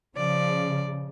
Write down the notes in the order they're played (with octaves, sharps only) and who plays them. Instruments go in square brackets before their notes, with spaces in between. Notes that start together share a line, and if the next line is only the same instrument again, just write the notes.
[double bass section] C#3 [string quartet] F3 D5